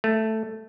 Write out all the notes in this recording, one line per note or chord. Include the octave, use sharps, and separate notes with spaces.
A3